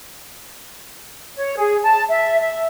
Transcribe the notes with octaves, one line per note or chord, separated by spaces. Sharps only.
C#5
G#4
A5
E5
E5